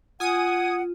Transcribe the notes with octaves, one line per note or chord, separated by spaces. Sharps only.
F4 F#5 G#5 D#6 D#7